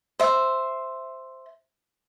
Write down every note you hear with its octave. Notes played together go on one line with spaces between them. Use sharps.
C5 E5